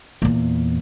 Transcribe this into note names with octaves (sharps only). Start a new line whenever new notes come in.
E2 A#2